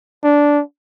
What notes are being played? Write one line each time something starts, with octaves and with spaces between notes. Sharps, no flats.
D4